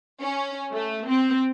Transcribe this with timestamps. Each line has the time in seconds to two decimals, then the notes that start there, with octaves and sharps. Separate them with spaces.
0.21 C#4
0.74 A3
1.09 C4